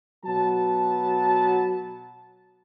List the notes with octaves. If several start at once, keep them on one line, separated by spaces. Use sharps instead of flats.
B2 F#3 B3 A5